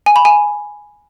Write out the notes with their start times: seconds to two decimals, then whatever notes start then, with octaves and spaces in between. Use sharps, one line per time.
0.06 G#5
0.16 B5
0.25 G#5